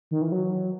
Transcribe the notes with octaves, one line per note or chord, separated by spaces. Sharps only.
D#3
E3
F#3